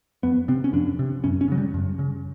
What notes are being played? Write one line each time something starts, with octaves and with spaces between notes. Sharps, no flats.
F2 B3
C3 C4
C#4
F2 D4
C3
F#2 C#4
C#4
C#3 F#3
G3
F#2
C#3